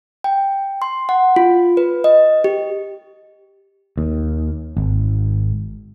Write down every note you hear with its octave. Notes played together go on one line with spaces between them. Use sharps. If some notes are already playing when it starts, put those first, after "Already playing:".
G5
C6
F#5
F4
B4
D#5
G4
D#2
G#1